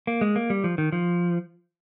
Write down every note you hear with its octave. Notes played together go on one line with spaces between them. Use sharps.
A#3
G#3
A#3
G3
F3
D#3
F3